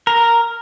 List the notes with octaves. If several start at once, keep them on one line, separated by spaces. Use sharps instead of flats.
A#4